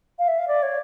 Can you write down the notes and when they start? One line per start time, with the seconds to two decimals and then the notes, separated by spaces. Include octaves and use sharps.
0.19 F5
0.28 E5
0.39 F5
0.48 D5
0.63 C#5